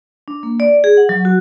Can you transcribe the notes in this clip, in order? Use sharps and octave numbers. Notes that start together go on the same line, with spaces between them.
D4
A#3
D5
G#4
F#5
F#3
F#4